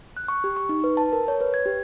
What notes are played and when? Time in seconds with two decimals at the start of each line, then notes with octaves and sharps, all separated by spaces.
0.17 F#6
0.28 C#6
0.44 G4
0.57 C#6
0.69 D#4
0.84 B4
0.97 A5
1.13 A#4
1.28 C#5
1.41 B4
1.54 G#6
1.66 G4